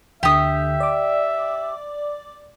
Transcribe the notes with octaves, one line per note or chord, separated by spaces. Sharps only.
D2 D3 G4 E5 D#6
D5 D6